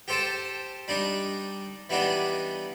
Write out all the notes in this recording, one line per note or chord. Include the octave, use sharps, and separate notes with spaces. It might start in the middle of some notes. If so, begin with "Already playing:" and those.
G4 A4 C5 G5 A5
G3 D4 D#4
E3 G3 B3 D4 D#4